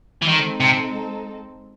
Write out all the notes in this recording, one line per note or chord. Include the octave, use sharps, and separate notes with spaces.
E3
D#3 G#3 C4 D#4 A4
C3